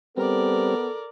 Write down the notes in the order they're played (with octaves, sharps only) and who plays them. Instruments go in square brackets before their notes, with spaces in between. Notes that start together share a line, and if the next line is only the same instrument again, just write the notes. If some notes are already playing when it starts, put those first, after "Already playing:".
[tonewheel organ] G3 C4 [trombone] B3 [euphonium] A4 [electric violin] A#4 D5